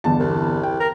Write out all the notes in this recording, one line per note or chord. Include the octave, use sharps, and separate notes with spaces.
G1 E2 A5
C2
G5
A#4